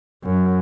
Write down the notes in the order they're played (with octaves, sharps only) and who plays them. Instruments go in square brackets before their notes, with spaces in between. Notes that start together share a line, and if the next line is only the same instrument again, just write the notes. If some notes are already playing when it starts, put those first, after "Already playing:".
[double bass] F#2